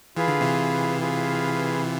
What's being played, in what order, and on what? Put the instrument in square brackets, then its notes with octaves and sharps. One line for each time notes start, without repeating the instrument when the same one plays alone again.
[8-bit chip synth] E3 [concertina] F4 G#4 B4 F5
[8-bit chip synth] D3
C3 E3
[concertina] F4 G#4 B4 F5
F4